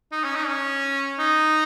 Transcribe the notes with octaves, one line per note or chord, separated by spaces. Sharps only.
D#4
C#4
D#4
C#4
D#4